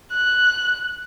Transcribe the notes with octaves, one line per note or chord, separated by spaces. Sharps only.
F#6